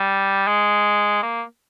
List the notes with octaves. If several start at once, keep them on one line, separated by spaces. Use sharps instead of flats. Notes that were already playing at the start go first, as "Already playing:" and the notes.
Already playing: G3
G#3
A#3